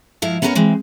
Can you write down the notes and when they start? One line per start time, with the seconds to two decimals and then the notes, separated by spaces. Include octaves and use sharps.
0.22 G#2 F3 E4 F5
0.42 B3 C#4 E4 A4 A#4 C#5
0.55 E3 G#3 C4